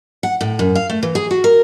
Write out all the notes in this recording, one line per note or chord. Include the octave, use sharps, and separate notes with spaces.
F#5
A2
F#2
F5
A3
E3
G#4
F#4
A#4